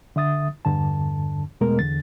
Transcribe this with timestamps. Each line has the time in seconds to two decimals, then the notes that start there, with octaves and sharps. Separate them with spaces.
0.16 D3 E5 D#6 A6
0.65 E2 G2 D3 A5
1.61 E2 B2 G#3 A3 B3 A#4
1.79 E2 D3 A6